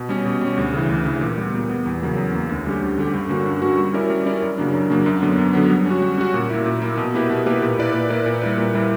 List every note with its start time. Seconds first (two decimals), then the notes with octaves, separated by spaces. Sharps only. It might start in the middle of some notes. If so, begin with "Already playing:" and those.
Already playing: B2
0.09 G3 C#4
0.25 B2
0.41 G3 C#4
0.57 D2
0.74 C#3 E3
0.89 D2
1.05 C#3 E3
1.21 A#2
1.37 G3 B3
1.54 A#2
1.70 G3 B3
1.86 E2
2.02 C#3 F#3 A#3
2.17 E2
2.33 C#3 F#3 A#3
2.49 D2
2.66 D3 G3 C#4 G4
2.81 D2
2.97 D3 G3 C#4 G4
3.14 G2
3.29 D3 A#3 C#4 F#4
3.46 G2
3.62 D3 A#3 C#4 F#4
3.77 G3
3.93 C#4 E4 A#4 D5
4.10 G3
4.26 C#4 E4 A#4 D5
4.42 F#2
4.58 C#3 F#3 A#3 D4
4.74 F#2
4.90 C#3 F#3 A#3 D4
5.06 F#2
5.22 D3 F#3 B3
5.38 F#2
5.53 D3 F#3 B3
5.70 G3
5.86 C#4 F#4
6.02 G3
6.18 C#4 F#4
6.34 A#2
6.50 A#3 E4
6.66 A#2
6.82 A#3 E4
6.97 B2
7.14 A#3 E4 G4 B4
7.30 B2
7.46 A#3 E4 G4 B4
7.62 A#2
7.78 A#3 E4 B4 D5
7.94 A#2
8.10 A#3 E4 B4 D5
8.26 A#2
8.42 G3 A#3 E4 B4
8.58 A#2
8.74 G3 A#3 E4 B4